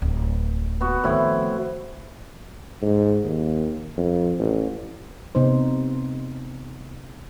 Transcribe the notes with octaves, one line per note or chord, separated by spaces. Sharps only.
D1
B3 F#4
A2 D#3 F3 C4 E4
G#2
D#2
F2
A1
C3 B3 D#4 C5